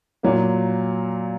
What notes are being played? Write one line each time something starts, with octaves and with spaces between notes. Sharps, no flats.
A#2 F#3 A#3